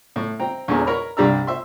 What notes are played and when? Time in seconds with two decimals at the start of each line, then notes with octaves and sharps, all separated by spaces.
0.16 A2
0.40 C4 G5 A#5
0.68 E2 A#2 D3 G#3 C#4
0.87 A#4 C#5 A#5 B5
1.17 C2 G2 G3 D4 A#5 E6
1.47 C5 E5 C6